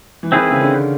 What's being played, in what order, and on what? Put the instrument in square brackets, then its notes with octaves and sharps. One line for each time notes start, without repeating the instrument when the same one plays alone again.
[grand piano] E3
[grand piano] D#3 [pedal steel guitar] C4 E4 G#4 B4
[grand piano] C#3
D3